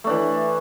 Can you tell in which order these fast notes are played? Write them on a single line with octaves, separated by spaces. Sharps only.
A3 D4 E3